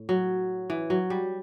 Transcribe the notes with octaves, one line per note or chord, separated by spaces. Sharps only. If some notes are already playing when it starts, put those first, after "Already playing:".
Already playing: A2
F#3
E3
F#3
G3